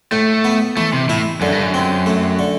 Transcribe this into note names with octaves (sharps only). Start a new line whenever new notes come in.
A2 A3
B3
E3 A3
C3
A2 E4
F#2 D3
G2
F#2
C4
A3
D3